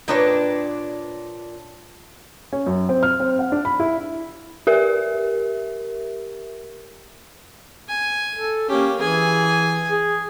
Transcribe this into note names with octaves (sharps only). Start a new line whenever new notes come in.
A#2 D4 B4 C#5 D#5 G5
C#4
F#2
C4
F6
C4
F#5
D4
B5
E4
G4 A#4 E5
G#5
A4
A#3 C#4 G4
E3 G#4 G#5
G#4